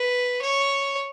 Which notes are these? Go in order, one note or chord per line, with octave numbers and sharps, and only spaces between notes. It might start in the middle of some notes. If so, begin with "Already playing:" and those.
Already playing: B4
C#5